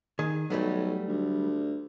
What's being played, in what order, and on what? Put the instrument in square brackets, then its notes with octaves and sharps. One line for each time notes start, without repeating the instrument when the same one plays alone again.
[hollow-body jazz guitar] D#3 G#4
[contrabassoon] B1 [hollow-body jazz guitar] F#3 G3 A3
[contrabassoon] D2